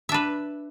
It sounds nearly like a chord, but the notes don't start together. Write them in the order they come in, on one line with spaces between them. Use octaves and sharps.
E5 D4 B4